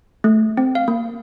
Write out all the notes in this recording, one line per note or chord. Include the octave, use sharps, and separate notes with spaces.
A3
C4
F5
A#3